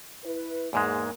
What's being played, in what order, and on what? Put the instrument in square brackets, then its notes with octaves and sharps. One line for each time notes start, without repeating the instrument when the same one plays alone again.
[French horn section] E4 B4
[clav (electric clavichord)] E2 G#2 G#3 [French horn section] A#3